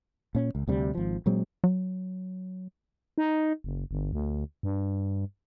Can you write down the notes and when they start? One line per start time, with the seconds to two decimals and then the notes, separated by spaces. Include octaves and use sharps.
0.35 A#2 C#4
0.55 C#2
0.68 D2 C3 G3
0.95 G#1 F3
1.26 A#2 F#3 G#3 C4
1.64 F#3
3.18 D#4
3.64 F#1
3.91 G1
4.13 D2
4.63 G2